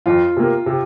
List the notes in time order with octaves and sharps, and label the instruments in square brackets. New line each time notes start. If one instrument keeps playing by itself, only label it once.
[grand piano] F2 [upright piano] F4
[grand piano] C3 A#3
C3